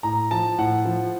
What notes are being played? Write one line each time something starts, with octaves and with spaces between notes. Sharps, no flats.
A2 A#5
F3 A5
A2 F#5
F3